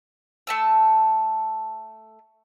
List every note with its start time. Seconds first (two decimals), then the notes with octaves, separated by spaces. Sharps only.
0.47 A3 A5 E6